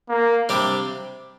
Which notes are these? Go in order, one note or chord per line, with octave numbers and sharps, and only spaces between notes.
A#3
C3 G3 D4 G4